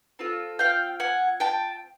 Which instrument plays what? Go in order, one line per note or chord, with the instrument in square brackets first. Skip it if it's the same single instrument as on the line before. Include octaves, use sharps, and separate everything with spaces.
[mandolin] C4 F4 A4
F5 G5
F#5 G#5
G5 A5